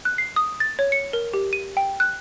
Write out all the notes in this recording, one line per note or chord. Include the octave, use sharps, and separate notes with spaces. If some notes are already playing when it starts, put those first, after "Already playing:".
F#6
C7
D#6
A6
C#5
C#7
A#4
G4
D#7
G5
F#6